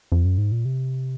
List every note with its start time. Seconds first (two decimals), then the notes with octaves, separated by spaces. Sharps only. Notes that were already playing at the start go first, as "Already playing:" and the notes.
0.12 F2
0.25 F#2
0.38 G#2
0.52 A#2
0.65 C3